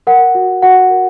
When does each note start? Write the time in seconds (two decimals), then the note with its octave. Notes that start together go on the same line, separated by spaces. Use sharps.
0.07 A#4 F#5
0.35 F#4
0.63 F#4 F#5
0.90 A#4